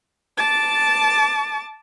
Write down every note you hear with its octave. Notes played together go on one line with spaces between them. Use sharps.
A5 D6 A6